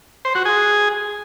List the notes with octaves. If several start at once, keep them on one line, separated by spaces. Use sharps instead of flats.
C5
F#4
G#4